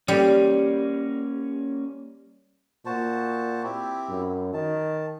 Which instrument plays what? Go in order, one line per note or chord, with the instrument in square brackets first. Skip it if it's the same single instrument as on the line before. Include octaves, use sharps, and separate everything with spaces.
[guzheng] G3 [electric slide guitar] A#3 C#4
[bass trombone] A#2 [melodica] F#4 C5 A5
[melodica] C4 E4 G4
[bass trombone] F#2
[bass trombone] D#3 [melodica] A5